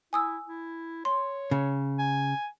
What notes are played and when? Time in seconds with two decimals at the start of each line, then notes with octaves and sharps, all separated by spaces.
0.13 E4 G#5 D#6 E6
0.47 E4
1.05 C#5 C6
1.51 C#3
1.99 G#5